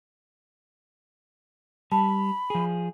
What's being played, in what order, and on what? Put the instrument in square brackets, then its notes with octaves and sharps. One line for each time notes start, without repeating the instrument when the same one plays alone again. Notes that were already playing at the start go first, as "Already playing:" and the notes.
[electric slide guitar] G3 [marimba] A5 [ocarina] B5
[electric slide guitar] F3 G#4